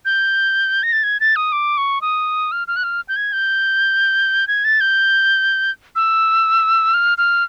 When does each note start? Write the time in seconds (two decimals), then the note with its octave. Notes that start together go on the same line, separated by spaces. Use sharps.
0.05 G6
0.83 A#6
0.93 A6
1.04 G#6
1.20 A6
1.36 D#6
1.52 D6
1.78 C#6
2.02 D#6
2.52 F6
2.68 F6
2.76 F#6
2.84 F6
3.09 G6
3.16 G#6
3.33 G6
4.48 G#6
4.65 A6
4.81 G6
5.96 E6
6.94 F6
7.18 F6